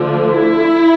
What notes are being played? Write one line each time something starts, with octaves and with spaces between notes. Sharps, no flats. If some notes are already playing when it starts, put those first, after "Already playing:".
Already playing: D3 F3 A3
E4